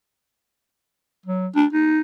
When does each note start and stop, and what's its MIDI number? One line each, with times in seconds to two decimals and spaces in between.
1.26 1.48 54
1.55 1.66 62
1.73 2.01 63